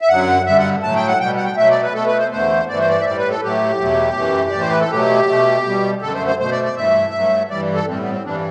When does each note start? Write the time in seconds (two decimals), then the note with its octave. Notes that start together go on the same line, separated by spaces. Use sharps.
0.01 E5
0.09 F#2 D3 F#3 F#5
0.46 G2 D3 G3 E5
0.58 F#5
0.83 A2 F#3 A3 A5
0.96 G5
1.08 F#5
1.20 B2 G3 G5
1.37 F#5
1.45 G5
1.57 B2 F#3 A3 E5
1.70 D5
1.82 B4
1.94 B2 A3 A4
2.07 B4
2.19 C5
2.31 E2 D3 A3 C5
2.68 G2 E3 A3 D5
2.79 C5
2.89 D5
3.00 E5
3.05 A2 G3 D5
3.18 B4
3.30 A4
3.43 A2 F#3 A3 G4
3.80 E2 B2 F#3 A3
4.16 F#2 E3 A3
4.50 A2 E3 A3 D5
4.60 C5
4.70 B4
4.81 A4
4.91 B2 F#3 A3 G4
5.28 B2 A3
5.65 B2 G3
6.02 F#2 D3 A3 A4
6.14 C5
6.27 C5
6.39 B2 A3 C5
6.52 D5
6.64 D5
6.76 G2 E3 A3 E5
7.13 G2 F#3 A3
7.50 G2 E3 G3 D5
7.74 A4
7.87 A2 G3 C4
8.00 B3
8.12 C4
8.25 G2 E3 G3 D4